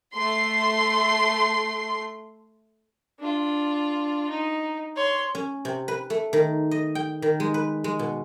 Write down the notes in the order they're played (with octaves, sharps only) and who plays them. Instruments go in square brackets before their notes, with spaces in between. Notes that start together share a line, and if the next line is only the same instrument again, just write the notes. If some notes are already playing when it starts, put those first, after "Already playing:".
[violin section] A3 C6 C7
[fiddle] D4 F4
D#4
C#5 C6
[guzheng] C#4
C3
B4
A3
D#3
D#5
G5
D#3
G#3
B4
G#3
B2